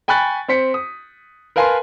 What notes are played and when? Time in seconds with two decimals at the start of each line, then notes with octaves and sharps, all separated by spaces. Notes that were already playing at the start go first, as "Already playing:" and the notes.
0.08 G5 G#5 B5 C#6 F#6 A6
0.48 C4 C5 B6 C#7
0.74 D#6
1.56 A#4 B4 F5 G#5 A5 C6